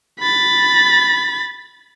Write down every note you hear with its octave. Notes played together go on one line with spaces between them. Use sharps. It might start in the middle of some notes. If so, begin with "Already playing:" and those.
B5 A6